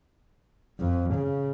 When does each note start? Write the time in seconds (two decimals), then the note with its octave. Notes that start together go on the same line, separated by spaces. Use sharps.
0.80 F2
1.15 C#3